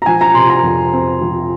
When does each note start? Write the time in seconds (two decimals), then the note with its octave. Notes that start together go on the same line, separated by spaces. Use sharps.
0.02 A#5
0.06 F3 G#5
0.21 A#5
0.34 C3 C6
0.50 A#5
0.63 F2
0.93 C4
1.21 F3